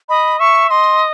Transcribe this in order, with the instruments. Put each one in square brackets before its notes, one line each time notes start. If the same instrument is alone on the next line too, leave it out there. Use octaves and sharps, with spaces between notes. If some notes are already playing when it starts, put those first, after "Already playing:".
[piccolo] D#5 [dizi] B5
[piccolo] E5 [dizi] C#6
[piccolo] D#5 [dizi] C6